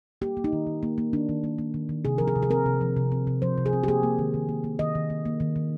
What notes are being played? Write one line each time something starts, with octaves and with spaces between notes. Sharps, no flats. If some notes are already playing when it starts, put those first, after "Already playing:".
A#3 G4
A#3
D#4
D#3
D#3
A#3
A#3
D#3 D4
D#3
A#3
A#3
D#3
D#3
C3 G#4
F3 A#4
G#4
C3
G#4
C4 A#4
C3
F3
C3
C4
C3
F3 C5
C3
G#4
C4
G4
A#3 G#4
A#3
D#3
D#3
A#3
A#3
D#3 D#5
D#3
A#3
A#3
D#3
D#3